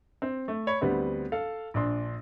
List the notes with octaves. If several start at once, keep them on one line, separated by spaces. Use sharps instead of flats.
C4
A3
C#5 B5
D2 G3 B3 C4
A4 F5
A#1 D4 C6